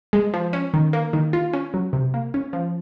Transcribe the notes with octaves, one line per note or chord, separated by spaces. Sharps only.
G#3
F3
C#4
D#3
A#3
D#3
F4
C#4
F#3
C3
A#3
C#4
F3